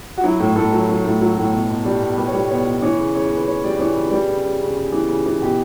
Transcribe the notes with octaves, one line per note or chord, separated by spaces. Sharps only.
F#4
F#3 E4
A2
A2 A4
F#3
F#3
A2
F#3
A2
B2
B2
G3
B2
G3 B4
C#5
G3 B4
B2 C#5
B2
E3 C#5
C#3
C#3 C#5
C#3
B4
C#3 C#5
G3 D5
E3 C#5
C#3 B4
G3
C#3
C#3
C#3
C#3
E3
C#3
E3
B2 G4